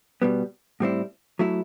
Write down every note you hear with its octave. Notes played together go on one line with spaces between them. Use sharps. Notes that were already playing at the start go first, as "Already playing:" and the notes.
B2 G3 B3
A2 G3 C4 E4
F#3 A3 E4